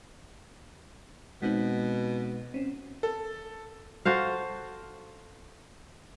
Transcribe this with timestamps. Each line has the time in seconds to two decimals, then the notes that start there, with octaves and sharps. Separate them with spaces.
1.42 B2 G#3 C4 D#4
2.54 C4 C#4
3.03 A4
4.05 F#4 A4 C5 F5